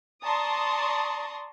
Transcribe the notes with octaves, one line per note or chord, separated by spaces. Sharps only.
D5 A5 A#5 C6 C#6 D#6